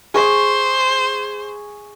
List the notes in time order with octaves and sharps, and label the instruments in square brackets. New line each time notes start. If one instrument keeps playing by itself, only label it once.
[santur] G#4 C#6 D#6 [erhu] C5